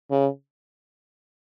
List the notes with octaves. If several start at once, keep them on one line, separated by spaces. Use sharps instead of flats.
C#3